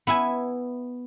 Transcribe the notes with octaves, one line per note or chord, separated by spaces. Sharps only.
B3 E4 E5 G#5